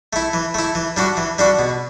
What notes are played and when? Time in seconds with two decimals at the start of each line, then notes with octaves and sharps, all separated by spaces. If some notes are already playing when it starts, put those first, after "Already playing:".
0.13 A3 E4
0.33 E3
0.54 A3 E4
0.75 E3
0.97 G3 D4 F#4
1.17 E3
1.38 G3 D4 F#4
1.59 B2